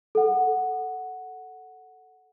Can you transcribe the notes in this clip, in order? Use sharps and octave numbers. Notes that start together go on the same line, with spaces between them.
A4 F#5